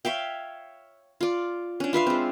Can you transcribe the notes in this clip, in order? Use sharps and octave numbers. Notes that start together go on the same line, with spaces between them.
C#5 E5 F5 G5
F4 D5
C#4 D4
F4 B4 E5 F5
G#3 C4